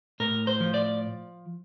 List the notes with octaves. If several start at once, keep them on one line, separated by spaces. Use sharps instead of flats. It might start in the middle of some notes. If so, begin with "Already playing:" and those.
A2 A#4
C5
F3
D5